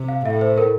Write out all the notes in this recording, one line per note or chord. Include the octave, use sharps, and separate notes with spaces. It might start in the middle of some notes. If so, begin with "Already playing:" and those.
Already playing: C3
F5
A2 E5
C5
A#4